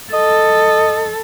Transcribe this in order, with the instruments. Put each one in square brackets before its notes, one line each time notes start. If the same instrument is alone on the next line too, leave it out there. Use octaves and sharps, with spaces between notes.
[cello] A4 [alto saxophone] D#5